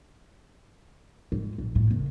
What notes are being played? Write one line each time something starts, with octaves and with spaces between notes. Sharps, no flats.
G#2
A#1
A2
F#1